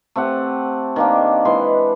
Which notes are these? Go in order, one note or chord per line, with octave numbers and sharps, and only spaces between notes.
A3 C4 G4 F#5
D#3 A#3 D4
E3 G#3 B5 C6